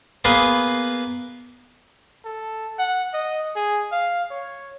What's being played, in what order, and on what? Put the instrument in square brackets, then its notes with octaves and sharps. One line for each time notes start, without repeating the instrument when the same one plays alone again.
[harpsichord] A#3 B3 G#4 B4 F5 C6
[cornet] A4
F#5
D#5
G#4
F5
C#5